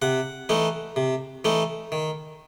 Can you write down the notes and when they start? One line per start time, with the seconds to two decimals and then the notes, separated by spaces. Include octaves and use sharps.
0.02 C3 F#5
0.49 E3 A3 D#4
0.96 C3
1.45 E3 A3 D#4
1.92 D#3